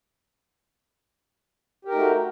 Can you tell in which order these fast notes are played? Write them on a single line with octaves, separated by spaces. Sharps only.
G4 A#4 D#4 A3 F#4